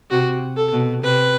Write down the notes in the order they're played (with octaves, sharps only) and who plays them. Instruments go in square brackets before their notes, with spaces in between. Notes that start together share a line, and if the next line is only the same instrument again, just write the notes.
[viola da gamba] C3 [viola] F#4
[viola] A4
[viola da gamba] B2
[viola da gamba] C3 [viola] B4